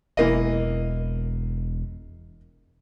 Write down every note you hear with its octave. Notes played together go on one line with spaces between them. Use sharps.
E1 E3 A#3 D#5